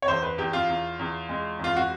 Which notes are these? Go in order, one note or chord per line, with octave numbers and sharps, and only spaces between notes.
C#5
E2 C5
B4
E2 G4
F4
E2
E2
G#3
E2 F4
F#4